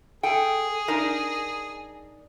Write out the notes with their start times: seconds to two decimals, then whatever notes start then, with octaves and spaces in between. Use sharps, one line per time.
0.23 G#4 A4 G5
0.88 D4 D#4 A#4